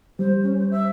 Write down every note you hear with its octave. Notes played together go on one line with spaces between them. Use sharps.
G3 C5
C#4
C5
E5